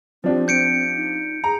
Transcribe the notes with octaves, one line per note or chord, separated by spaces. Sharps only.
F3 C4 D4 G4
C4 G6 C#7 D7
D#4
G#4 A#5